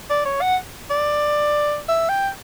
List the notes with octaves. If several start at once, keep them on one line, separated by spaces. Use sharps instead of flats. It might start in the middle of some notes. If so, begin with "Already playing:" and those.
D5
C#5
F#5
D5
E5
G5